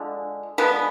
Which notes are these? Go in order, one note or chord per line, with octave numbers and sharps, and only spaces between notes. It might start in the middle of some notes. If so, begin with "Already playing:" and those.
Already playing: D3 F3 G#3
D3 F3 G#3 B3 B4